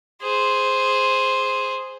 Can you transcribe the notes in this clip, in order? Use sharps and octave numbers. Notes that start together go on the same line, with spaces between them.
G#4 C5